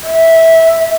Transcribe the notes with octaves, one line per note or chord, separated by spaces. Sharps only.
E5